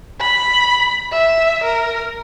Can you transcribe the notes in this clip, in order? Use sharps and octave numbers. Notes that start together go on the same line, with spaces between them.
B5
E5
A#4